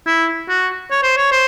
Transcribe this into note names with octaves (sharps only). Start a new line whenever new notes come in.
E4
F#4
C#5
C5
C#5
C5